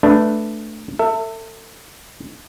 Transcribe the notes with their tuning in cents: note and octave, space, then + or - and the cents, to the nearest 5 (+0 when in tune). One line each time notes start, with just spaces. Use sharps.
A3 +0 D4 +5 B4 +0
A4 +35 E5 +0